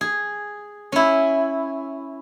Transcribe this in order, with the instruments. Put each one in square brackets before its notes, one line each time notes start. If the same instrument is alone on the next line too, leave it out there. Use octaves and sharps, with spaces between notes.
[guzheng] G#4
C#4 E4